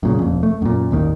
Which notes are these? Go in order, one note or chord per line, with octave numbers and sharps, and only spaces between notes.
F#2 A#2 C#3
E1 F2
A3
F#2 A#2
G#1 D#2 C3 D#3